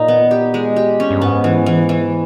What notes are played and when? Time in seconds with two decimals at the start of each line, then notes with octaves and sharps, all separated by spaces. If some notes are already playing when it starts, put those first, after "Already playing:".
Already playing: A#2 D#4
0.08 B3
0.31 G4
0.54 G#3
0.76 G4
1.00 C#4
1.11 G2
1.21 G#2 B3
1.44 E3
1.66 E3
1.89 E3